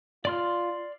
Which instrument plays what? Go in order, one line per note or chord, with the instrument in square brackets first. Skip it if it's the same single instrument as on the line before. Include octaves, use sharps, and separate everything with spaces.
[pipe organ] F4 [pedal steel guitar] D5 C6 F6